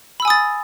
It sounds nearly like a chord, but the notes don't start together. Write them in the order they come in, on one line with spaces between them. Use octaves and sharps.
B5 E6 G#5 D#6 A6